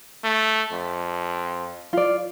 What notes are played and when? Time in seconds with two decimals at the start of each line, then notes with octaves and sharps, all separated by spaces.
0.24 A3
0.72 F2
1.93 F4 D5